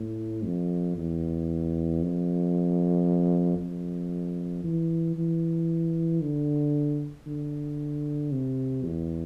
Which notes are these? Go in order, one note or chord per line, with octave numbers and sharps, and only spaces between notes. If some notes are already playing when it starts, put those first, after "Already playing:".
Already playing: A2
F2
E2
F2
F2
E3
E3
D3
D3
C3
E2